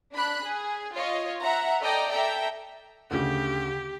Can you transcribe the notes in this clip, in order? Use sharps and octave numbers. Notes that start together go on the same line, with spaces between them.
D4 B5 F#6
G#4
F4 C#5 D#5
E5 F#5 A#5
A4 D5 D#5 G5 A#5
A4 E5 G5 A#5
D2 C#3 G4